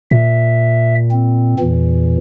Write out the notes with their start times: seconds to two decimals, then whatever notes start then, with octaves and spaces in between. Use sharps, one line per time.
0.11 A#2 E5
1.12 C4
1.59 E2 A#2 E3